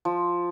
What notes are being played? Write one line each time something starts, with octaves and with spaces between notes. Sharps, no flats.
F3